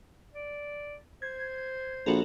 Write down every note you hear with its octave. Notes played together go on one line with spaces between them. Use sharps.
D5
C5 G#6
A#1 F#4 A4 A#4